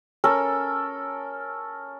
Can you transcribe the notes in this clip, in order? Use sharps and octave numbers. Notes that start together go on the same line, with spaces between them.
C#4 A4 A#4